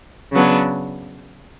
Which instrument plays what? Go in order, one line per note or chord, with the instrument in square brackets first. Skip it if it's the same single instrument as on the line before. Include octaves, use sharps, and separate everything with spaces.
[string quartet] C#3 F#3 B3 D4